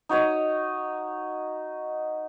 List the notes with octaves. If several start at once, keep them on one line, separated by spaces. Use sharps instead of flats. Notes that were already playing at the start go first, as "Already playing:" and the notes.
D#4 F#4 C#5 D#5